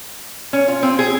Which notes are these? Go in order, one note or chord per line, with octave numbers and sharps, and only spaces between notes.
C#4
F4
C4
G#4